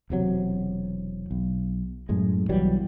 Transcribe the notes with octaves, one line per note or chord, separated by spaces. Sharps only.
E1 C3 F#3
B1
F#2 A2 G#3
B1 E3 F#3 G3